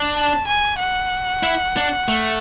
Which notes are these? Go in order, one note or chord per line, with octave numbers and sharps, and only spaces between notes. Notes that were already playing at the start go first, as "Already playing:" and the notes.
Already playing: D4
A5
G#5
F#5
E4
D4
A3